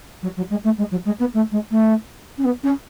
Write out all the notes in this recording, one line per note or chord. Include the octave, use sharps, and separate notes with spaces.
F#3
F#3
G#3
A3
G#3
F#3
G#3
B3
A3
G#3
A3
C#4
B3
C#4